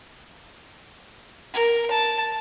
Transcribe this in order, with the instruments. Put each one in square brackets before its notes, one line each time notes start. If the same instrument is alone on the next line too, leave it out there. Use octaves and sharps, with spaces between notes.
[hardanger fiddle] A#4
A5